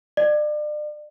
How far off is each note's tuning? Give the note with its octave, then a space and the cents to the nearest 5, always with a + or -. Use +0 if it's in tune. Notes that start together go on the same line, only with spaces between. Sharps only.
D5 +35